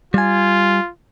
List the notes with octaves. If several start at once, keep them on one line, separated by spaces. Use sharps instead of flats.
G3 F4 G#5